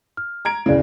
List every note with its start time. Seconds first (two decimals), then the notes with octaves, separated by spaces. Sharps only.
0.17 F6
0.45 A#5 G#6 D7
0.66 D1 C#3 E4 D5